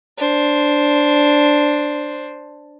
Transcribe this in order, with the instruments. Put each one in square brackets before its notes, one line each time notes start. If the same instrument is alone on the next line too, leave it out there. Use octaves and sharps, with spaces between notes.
[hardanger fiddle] D4 C5